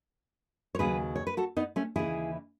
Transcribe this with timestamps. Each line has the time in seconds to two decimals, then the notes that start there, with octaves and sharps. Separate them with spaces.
0.75 C#5
0.79 D#2 C#3 F#3 G#4 B4
1.16 C#5
1.27 B4
1.37 F#4 A4
1.57 B3 D#4
1.76 A3 C#4
1.96 D#2 C#3 E3 E4 G#4